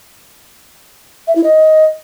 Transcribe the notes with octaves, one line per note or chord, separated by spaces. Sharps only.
E5
E4
D#5